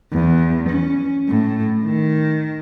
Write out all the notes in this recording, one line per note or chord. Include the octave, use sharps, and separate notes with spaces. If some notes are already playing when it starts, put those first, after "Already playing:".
E2
C#4
A2
D#3